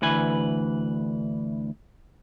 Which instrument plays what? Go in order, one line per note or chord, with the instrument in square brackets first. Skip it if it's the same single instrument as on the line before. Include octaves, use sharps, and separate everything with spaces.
[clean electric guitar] D2 E3 B4 G#5